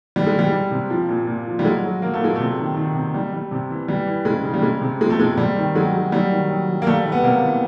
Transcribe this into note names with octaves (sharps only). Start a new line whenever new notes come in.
E3 G3
G#3
E3 G3
G3
C3
F3
A#2
A#2
F3
G3
F#3 G#3
F#3
F#3 A#3
A3
A#2 G#3
C3 A3
D#3
D#3
C3
G3
G3
C3
E3
E3 G3
E3
C#3 G#3
C#3
G3
C3 G#3
C3
F3 G#3
A3
C3 G#3
C3 G3
D#3
F#3 G#3
F#3
F#3 G3
D#3
F#3
F#3
A#3
G3 A3
G3
B3
C3 A#3
E3